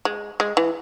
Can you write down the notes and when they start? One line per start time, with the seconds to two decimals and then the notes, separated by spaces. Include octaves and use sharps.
0.05 G#3
0.40 G#3
0.57 E3